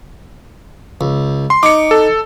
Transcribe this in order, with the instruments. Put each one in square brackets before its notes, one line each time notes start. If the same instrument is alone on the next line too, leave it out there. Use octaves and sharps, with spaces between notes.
[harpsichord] C#2
[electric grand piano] C6
[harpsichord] D#4 [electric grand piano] D6 C#7
[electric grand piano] A4